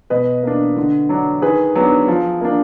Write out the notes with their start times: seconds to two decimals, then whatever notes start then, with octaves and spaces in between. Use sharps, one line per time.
0.10 B2 B4 D#5
0.43 A#3 D4
0.76 D3
1.09 F#3 D4
1.42 D#3 G#4 B4
1.75 F#3 B3 D4
2.08 F3
2.41 A#3 D4